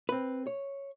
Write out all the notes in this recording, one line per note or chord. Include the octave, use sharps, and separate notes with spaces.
C4 B4
C#5